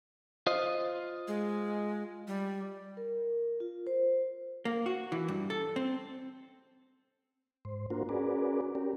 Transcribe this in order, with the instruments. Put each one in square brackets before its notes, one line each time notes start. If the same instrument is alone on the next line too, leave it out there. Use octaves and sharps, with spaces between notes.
[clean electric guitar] F4 C5 D#5
[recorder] G#3
G3
[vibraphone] A#4
F4
C5
[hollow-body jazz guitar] A#3
F#4
E3
G2
A4
C4
[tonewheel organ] G#2 C5
A#3 D4 F4 F#4 A#4 C5
C#4 F#4 G#4 A#4 B4 D5
C#4 G4 A#4